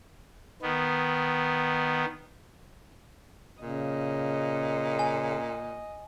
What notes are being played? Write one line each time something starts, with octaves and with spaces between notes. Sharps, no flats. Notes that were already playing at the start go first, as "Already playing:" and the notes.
D#3 B3
A#2 C#3 D#5
G#5